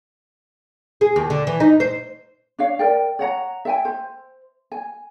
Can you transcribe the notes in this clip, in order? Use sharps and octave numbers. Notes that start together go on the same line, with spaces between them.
G#4
D#2
D3
E3
D#4
C5
D4 C#5 F5
A#4 D5 G5
C#5 F#5 A#5
E5 G5 G#5
C5
G#5